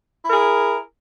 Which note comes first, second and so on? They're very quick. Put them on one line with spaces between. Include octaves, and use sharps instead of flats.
E4 A#4 G#4